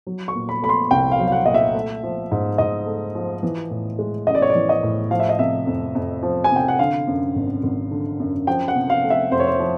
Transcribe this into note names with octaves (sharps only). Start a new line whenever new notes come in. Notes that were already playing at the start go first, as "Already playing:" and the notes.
F#3
C#6
A#2
B5
A3 B5
C6
C2 G5
F5
F#3
F5
F#5
A#2 D#5
E5
A3
F3
G#2
G#2 D#5
A3
F3
E3
A2
G#3
A1 D#5
D5
C#5
D5
E3
D#5
A2
F3 F5
E5
D#5
C3 E5
F2
F2
F3
G#5
C3 G5
F#5
D3 F5
F#2
G#1
G#1
D3
F#2
F3 G5
F#5
C3
F5
A3
E5
F2 C5
C#5
C5
F3